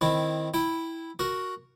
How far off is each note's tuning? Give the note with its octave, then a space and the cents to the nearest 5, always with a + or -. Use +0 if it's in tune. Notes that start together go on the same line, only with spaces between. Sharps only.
D#3 +0 C4 +0 E4 +0
E4 -5 G5 +0
F#4 +0 A#4 +0